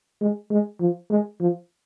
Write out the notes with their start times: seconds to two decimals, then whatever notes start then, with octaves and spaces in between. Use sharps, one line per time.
0.21 G#3
0.51 G#3
0.80 F3
1.10 G#3
1.40 F3